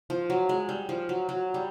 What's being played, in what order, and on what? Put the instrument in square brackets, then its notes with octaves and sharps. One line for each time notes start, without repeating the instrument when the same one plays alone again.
[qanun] F3
F#3
G#3
G3
F3
F#3
F#3
G3